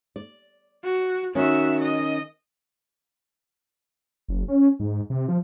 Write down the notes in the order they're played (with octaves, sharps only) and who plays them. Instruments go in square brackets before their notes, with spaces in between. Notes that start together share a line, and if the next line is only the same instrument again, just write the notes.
[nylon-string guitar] D5
[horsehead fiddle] F#4
[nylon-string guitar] D#3 C#4 [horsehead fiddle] F#4 E5
[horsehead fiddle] D#5
[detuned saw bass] F#1
C#4
G#2
C3
F3